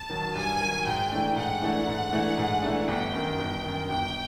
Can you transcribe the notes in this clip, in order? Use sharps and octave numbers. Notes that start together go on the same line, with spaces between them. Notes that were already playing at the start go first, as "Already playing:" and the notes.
Already playing: A5
D#3 F#3
G2 G#5
D#3 F#3
G#2 G5
E3 A3 D4
G#2 F#5
E3 A3 D4
G#2
E3 A3 D4
G#2
E3 A3 D4
G1 G5
F#2 D#3
G1
F#2 D#3
G1 G5